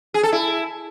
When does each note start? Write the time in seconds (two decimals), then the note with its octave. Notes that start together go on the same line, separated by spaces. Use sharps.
0.14 G#4
0.23 A4
0.32 E4